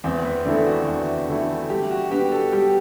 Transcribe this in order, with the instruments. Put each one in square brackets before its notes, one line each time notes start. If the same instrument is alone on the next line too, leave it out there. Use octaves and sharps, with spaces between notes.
[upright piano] E2 [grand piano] C4
[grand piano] B3
[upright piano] D3 A3 E4 A4 [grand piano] D4
[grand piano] F#4
[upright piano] E2
D3 A3 E4 A4
[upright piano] G3 [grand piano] G4
[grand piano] F#4
[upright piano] B3 D4 [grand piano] G4
[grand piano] A4
[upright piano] G3 [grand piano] G4